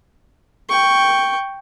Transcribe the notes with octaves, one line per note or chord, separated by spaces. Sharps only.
G5 C#6